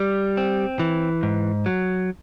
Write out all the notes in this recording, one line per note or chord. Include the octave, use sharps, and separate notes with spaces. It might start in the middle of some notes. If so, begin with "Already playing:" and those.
Already playing: G3
C4
E3
G#2
F#3